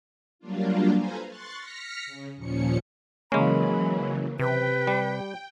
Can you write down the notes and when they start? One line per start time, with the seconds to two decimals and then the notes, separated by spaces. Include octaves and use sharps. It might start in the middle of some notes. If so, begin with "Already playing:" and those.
0.39 F#3 G3 A#3 D4 F4
0.93 A4 B4 C5 F5 G#5 A#5
1.27 C6 C#6 F#6 A6
1.56 F6 A#6 B6 C#7
2.06 C#3
2.36 D#2 A#2 F3 C#4 C#7
3.32 C#3 E3 F#3 G#3 A#3 C#4 B5
4.39 C3 B4 G5
4.87 G3